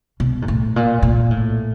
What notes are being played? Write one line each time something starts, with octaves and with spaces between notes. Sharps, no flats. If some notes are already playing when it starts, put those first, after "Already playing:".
B2
G#2
A2
A#2
A#2
A2